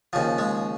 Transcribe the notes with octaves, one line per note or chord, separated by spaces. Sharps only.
D#2 C#3 F3
G#3